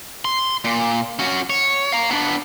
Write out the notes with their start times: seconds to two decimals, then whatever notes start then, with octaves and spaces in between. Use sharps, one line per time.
0.25 C6
0.65 A#2
1.19 C#4 F#4
1.50 C#5
1.92 F5 A#5
2.11 B3 D4